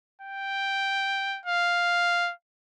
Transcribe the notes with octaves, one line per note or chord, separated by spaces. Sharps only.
G5
F5